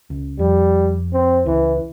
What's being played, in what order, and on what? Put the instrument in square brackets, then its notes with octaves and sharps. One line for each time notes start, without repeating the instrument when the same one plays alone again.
[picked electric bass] C#2
[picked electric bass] F2 [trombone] G3
[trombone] C4
[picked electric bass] C#2 [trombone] E3